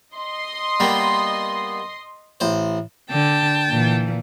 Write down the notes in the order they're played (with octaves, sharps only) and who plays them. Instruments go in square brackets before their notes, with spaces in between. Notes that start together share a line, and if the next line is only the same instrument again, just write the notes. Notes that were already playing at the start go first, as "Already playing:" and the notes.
[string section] D#5 C6 D#6
[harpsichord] G3 A#3 B3
A1 C5
[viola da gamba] D3 [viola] G5 A5
[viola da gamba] A#2 E3